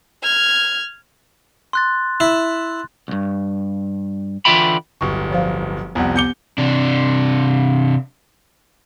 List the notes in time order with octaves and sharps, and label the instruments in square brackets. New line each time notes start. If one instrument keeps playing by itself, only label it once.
[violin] F6 G#6
[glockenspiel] C6 F#6 A6
[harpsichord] E4
[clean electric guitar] C2 G2
D3 E3 F4 E5 G5 B5
[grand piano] D1 G1 [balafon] C#6
[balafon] F3 C5 F5
[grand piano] C2 F2 [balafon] B3 F#5
[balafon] B3 D6 [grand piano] G6 C#7 G7
[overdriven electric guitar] C3 D4